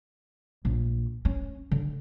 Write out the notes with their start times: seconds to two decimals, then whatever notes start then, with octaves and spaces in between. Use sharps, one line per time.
0.65 A#1
1.25 C#4
1.71 D3